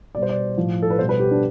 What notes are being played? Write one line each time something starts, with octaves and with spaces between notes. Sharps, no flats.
B2 G3 D5
C5
D5
A2 F3
A4
B4
B2 G3 C5
B4
G4
D4